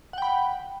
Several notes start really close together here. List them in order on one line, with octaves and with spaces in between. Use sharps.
F#5 G5 B5